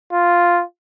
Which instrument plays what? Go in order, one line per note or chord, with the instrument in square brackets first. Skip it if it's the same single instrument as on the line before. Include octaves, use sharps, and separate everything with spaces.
[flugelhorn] F4